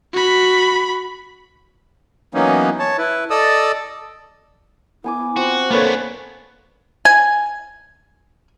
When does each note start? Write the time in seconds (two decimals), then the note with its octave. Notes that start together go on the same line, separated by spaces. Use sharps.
0.13 F#4 B5
2.34 E3 F#3 A#3 B3 C#4 D#4
2.79 C#5 A5
2.98 E4 B4
3.30 A4 D5 D#5 D#6 E6
5.04 B3 E4 G#5 D6
5.36 C4 F4 F#4
5.70 A#3 B3 D4 A4 B4 C#5
7.05 G#5